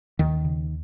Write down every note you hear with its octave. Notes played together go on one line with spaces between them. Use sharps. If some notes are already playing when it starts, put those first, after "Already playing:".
D#2 D#3
C#3